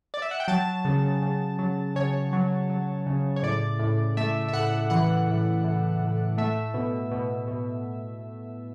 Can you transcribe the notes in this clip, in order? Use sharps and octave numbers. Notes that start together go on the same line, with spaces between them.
D5
E5
F#5
G5
F#3 A5
C#3
C#3
F#3
C#3 C#5
F#3
F#3
C#3
C#5
A2 D5
A2
A3 E5
E5
A2 F#5
E3 F#5
A2
A2
A2
A3 E5
B2
B2
B2